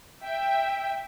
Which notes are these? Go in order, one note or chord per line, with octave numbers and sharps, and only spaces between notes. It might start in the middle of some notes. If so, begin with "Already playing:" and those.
E5 G5